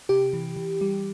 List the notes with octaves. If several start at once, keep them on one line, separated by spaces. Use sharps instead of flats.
C3 G4
E3
E3
G3